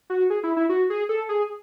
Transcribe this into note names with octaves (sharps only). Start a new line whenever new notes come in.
F#4
G#4
E4
E4
F#4
G#4
A4
G#4